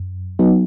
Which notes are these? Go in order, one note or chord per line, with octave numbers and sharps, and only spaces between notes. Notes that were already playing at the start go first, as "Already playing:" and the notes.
Already playing: F#2
F#3 B3 D#4